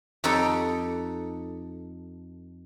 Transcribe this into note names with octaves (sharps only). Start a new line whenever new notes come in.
F2 D#4 G4 A4 C#5 G5